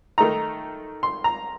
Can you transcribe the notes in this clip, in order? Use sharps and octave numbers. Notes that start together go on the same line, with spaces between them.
D#3 A3 D#4 A#5
C6
A#5